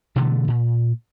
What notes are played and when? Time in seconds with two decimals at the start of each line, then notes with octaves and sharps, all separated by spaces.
0.16 B2 D3 E3 A3
0.48 A#2